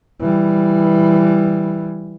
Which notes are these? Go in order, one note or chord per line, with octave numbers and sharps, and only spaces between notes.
E3 G3